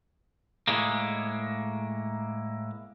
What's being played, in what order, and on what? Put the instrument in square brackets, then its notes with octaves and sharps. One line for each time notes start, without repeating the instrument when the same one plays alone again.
[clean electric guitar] A2 G#3 A#3